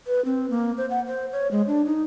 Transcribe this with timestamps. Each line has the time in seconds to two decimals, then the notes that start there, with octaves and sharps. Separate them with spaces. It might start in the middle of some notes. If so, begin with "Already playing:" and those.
0.07 B4
0.25 C4
0.50 A#3
0.77 C5
0.90 F#5
1.07 C5
1.32 C#5
1.51 G#3
1.67 D4
1.85 D#4